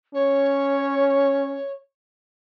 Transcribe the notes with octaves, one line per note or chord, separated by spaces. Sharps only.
C#4 C#5